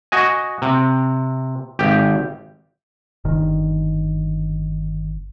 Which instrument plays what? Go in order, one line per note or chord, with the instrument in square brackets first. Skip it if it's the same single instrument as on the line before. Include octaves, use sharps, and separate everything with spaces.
[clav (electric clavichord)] F#4 D#5 G#5
C3
G#1 G4
[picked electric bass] G1 D#3